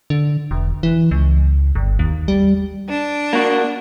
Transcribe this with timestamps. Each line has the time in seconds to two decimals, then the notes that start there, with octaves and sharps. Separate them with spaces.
0.10 D3
0.51 E1
0.83 E3
1.11 C#2
1.75 G1
1.99 D#2
2.28 G3
2.88 D4
3.33 A#3 F#4